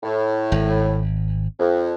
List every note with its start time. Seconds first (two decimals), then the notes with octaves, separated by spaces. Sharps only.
0.03 A2
0.52 G#1
1.59 F2